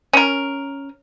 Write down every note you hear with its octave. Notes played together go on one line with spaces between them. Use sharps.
C#4 A#4